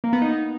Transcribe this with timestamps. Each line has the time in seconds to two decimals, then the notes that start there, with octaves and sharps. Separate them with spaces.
0.04 A#3
0.13 B3
0.22 D#4